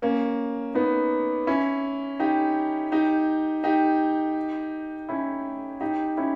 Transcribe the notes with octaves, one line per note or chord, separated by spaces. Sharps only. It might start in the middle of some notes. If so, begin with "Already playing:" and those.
A#3 C#4
B3 D#4
C#4 E4
D#4 G4
D#4 G4
D#4 G4
C#4 E4
D#4 G4
C#4 E4